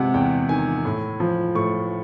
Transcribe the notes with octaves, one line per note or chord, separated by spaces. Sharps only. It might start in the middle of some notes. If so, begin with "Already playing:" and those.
Already playing: C3 G#3 F#5
E2 G5
D#3 G#5
A2
F3
A2 C#6